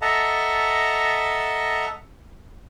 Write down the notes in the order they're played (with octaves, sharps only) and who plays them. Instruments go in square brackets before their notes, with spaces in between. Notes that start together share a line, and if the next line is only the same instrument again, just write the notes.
[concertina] A4 D#5 E5 F#5 A5 A#5